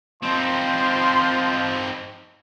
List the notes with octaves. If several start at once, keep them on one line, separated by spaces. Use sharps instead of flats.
F3 C4 D#4 C6